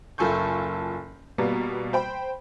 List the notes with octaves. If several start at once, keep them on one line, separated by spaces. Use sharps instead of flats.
F#1 F4 A4 G#5 C#6 G6
B2 G3 A#3 B3
C5 G5 B5